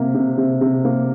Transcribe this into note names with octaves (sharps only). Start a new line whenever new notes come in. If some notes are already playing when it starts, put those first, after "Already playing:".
Already playing: C3 A#3
C3
C3
C3
A#3